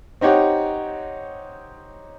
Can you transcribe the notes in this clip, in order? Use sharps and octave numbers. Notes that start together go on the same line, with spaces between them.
C4 D#4 G4 C#5 F#5